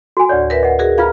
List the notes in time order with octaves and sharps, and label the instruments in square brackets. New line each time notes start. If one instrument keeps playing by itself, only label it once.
[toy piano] F#4 G#5
[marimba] D2 A2 [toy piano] C#5 D5
[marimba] A#4 B4 E5
[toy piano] D#5 F#5
[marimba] F#4 G#4 A#4
[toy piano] F4 F5 [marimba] A#5 F6 G#6